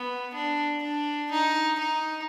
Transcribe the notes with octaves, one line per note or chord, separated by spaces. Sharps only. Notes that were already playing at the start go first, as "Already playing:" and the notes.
Already playing: B3
D4
D4
D#4
D#4